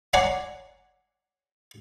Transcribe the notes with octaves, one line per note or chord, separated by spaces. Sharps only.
C#5 D5 F#5 G#5 A#5 C6